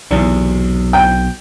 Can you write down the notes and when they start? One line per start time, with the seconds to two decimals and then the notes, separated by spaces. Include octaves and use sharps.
0.11 B1 E2 C3
0.93 G5